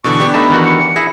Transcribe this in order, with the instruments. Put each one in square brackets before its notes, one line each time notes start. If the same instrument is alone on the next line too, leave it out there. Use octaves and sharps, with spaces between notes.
[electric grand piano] B2 D3 E3 [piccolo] C#6
[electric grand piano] B3 D4 G4
[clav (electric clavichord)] A3 D#4 A5 [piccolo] B5
[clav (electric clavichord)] D#3 E3 F#4
[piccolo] C#7
[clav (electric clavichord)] E4 G#4 [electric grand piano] A#6